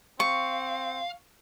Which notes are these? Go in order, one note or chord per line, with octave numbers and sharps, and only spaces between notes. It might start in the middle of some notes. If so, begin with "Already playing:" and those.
C4 F5 C#6